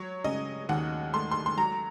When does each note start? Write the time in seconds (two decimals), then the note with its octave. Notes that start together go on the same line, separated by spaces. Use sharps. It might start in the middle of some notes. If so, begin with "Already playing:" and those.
Already playing: F#3 C#5
0.24 C#3 D#5
0.69 D#2 F#5
1.13 A3 C6
1.31 C6
1.46 C6
1.58 F#3 A#5